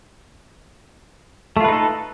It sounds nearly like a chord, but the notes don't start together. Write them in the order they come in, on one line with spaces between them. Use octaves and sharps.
A3 F4 B4 D#4 A4